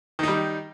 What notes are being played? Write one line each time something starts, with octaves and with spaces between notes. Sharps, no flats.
D#3 G3 D#4